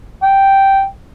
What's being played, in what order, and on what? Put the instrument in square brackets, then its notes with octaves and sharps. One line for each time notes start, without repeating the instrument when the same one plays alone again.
[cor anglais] G5